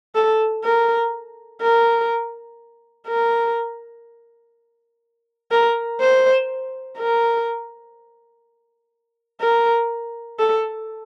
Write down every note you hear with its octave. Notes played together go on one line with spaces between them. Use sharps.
A4
A#4
A#4
A#4
A#4
C5
A#4
A#4
A4